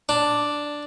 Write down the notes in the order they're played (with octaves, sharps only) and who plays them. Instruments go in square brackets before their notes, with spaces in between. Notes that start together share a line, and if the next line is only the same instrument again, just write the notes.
[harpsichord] D4